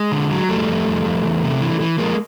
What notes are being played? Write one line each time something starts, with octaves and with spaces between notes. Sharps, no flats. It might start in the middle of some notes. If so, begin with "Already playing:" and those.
Already playing: G#3
D3
F#3
F2 G3 A3
F2
F2
F2
E2
C3
E3
E3
F3 G#3 A#3